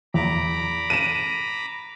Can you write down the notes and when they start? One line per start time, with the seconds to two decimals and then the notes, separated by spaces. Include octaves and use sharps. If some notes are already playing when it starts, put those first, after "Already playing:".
0.14 E2 A#5 B5 D6
0.90 D#7 E7